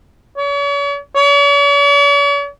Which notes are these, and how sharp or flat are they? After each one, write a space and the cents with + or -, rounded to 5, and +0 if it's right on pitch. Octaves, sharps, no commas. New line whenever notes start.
C#5 +40
C#5 +45